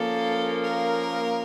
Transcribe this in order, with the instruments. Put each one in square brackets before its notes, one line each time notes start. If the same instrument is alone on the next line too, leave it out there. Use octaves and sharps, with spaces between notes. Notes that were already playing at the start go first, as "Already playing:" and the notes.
Already playing: [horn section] F3 A#3 C#4 [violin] A4
[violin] A#4